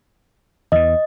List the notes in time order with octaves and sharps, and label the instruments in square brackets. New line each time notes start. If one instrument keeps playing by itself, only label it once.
[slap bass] E2 E3 [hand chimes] D#5